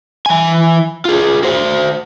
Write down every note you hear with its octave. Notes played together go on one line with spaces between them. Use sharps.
E3 G#5
F4 G#4
F#4 C5